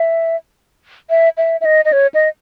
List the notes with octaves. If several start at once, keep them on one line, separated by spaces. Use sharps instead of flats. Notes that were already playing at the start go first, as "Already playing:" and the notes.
Already playing: E5
E5
E5
E5
D#5
D#5
C#5
D#5